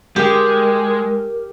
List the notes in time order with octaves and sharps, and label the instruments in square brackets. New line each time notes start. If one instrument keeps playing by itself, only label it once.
[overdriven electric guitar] G#3 [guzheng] G4 [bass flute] A#4